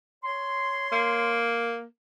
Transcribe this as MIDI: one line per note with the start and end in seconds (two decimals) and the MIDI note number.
0.23 1.39 73
0.23 1.39 84
0.92 1.85 58